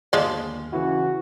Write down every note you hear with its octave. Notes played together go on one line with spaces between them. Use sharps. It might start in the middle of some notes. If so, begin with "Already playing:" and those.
G1 D#2 F3 G#3 D5 F6
C#3 E3 E4 F#4